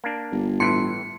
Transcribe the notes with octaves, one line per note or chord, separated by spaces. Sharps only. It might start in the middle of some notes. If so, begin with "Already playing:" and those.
A#3 D4
G1
A2 E3 C6 C#7